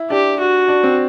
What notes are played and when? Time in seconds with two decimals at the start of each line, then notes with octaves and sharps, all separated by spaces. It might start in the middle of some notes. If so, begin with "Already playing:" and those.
Already playing: E4
0.10 D4 G4
0.40 F#4
0.68 D4
0.83 C4